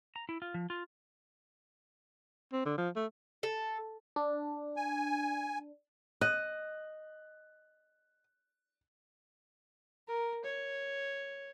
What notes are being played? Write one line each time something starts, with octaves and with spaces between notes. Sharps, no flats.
A#5
E4
F4
F3
F4
C4
D3
F3
A3
A4
D4
G#5
D#5 F#6
A#4
C#5